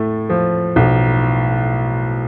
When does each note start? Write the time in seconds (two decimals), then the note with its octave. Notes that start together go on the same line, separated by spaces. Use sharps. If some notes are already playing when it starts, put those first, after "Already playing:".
Already playing: A2 A3
0.30 F3
0.76 B1